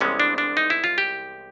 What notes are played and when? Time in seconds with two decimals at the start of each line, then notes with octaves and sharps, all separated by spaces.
0.01 C2 C3 E3 G#3 B3 C#4
0.20 D4
0.38 D4
0.57 D#4
0.70 E4
0.84 F4
0.98 G4